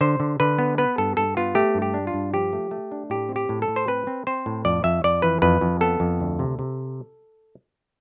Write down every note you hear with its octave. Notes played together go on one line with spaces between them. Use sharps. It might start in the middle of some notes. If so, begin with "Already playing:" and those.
D3 C5
D3
D3 B4
B3
B3 B4
G2 A4
G2 A4
B3 F4
A3 G4
G2
G4
D4
F4
G2
F3 G4
A3
A3
D4
A2 G4
C4
G4
A2
A4
A2
C5
C4 B4
C4
C4 C5
A2
F2 D5
F2 E5
F2 D5
E3 B4
F2 B4
F2
B3 A4
F2
D2
C3
C3